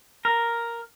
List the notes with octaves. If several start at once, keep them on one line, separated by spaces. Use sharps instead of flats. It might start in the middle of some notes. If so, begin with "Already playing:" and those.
A#4